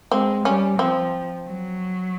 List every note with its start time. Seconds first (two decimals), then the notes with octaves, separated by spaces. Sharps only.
0.12 G#3 C4
0.45 G3 C#4
0.78 F3 C4
1.47 F#3